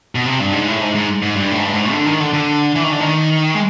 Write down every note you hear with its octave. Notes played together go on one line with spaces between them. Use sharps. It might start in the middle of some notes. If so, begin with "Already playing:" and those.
B2
C3
G2
G#2
A2
G#2
G#2
G#2
G2
A2
G#2
G2
G#2
D3
D#3
D3
D3
E3
D#3
D3
D#3
G#3